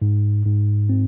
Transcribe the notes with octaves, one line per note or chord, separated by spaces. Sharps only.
G#2
G#2
C4